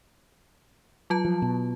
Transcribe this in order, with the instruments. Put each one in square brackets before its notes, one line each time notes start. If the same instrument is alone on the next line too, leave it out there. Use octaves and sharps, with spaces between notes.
[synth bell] F#3 F4 A5
[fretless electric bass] F3
B2